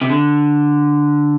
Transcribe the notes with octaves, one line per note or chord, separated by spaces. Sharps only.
C3
D3